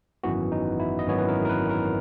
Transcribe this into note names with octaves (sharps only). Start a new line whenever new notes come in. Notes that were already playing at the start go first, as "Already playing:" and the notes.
G#1 F#2 E3 B3 F#4
D#4
E4
D#5
G#1 F#2 E3 B3 C#5
B4
A#4
A#4
B4
A#4